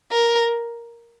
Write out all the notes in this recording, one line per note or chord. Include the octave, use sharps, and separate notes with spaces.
A#4